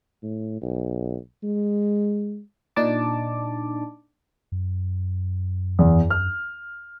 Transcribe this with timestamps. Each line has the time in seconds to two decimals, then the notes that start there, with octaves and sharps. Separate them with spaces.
0.23 A2
0.62 B1
1.43 G#3
2.76 A#2 D4 D#4 A5 D6
4.52 F#2
5.79 E2
6.10 F6